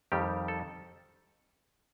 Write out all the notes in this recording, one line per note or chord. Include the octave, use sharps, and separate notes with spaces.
F2 D#3 G3 G4
A4